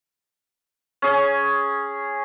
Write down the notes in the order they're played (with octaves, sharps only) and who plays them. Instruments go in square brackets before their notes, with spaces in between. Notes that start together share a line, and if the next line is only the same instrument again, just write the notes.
[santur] C#4 G#4